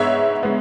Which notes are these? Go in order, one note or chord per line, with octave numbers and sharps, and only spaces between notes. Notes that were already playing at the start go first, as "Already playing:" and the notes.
Already playing: G#2 G#3 B3 C#5 E5
G#3 B3